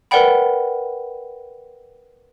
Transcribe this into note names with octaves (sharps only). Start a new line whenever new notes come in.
A#4 B4 D5 F#5 G5 B5